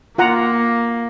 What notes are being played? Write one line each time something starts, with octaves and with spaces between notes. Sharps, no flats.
A#3 F4 F#5 A#5